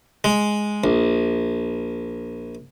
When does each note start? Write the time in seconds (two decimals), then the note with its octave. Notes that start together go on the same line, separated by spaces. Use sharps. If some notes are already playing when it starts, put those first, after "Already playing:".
0.24 G#3
0.84 A#1